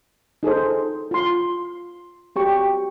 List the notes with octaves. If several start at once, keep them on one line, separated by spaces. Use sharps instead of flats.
D#4 G#4 A4 C5
F4 C6
F#4 G4 C#6